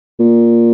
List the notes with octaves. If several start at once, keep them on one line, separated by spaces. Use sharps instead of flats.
A#2